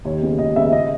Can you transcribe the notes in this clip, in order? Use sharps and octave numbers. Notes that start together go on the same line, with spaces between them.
D#2 C#5
C#3 G#3 B3
D#2 D#5
C#3 G#3 B3 E5
C#3 D#5